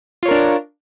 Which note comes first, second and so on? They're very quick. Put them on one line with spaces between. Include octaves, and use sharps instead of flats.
F4 C#5 A#4 D4